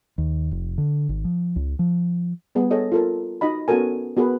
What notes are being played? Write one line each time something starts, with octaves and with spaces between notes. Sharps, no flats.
D#2
F1
D3
G#1
F3
C#2
F3
G3 B3 G#4 F#5
G#4 A4 C#5 D#5
F4 A4 A#4
D#4 F#4 D#5 B5
B3 C#4 F#4 A4 A#4 G#5
B3 F#4 G#4 A#4 B4